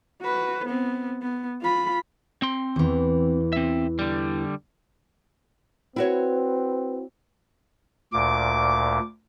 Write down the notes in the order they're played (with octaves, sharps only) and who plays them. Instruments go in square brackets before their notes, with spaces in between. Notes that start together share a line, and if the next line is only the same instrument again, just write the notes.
[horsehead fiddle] F#4 B4
B3 C4
B3
F4 B5
[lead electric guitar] C4 C6
[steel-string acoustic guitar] E2 E3
[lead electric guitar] C4 E5
D3 G3
[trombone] C4 [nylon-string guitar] E4 F#4 C#5 [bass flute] B4
[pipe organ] D2 A#2 [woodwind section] D6